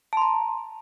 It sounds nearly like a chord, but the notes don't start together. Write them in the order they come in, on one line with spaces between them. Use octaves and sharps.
A5 C6 A#5